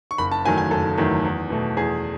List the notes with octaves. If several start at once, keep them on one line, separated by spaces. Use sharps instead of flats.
C#6
F#1 B5
A5
E2 D#3 F#3 A3 G#5
G#5
F#1 A4
E2 D#3 F#3 A3
E2
B2 A3
E2 G#4